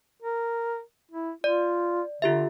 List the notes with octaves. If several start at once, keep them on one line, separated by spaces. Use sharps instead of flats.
A#4
E4
F4 D5
D3 F4 G4 E5